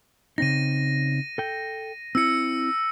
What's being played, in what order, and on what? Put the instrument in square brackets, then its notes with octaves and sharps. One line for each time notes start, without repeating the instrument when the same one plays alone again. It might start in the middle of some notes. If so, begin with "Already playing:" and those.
[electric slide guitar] C#3 C4 D#4 [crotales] A#6 D#7
[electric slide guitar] A4 G5
[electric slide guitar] C4 E4 [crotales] E6 C#7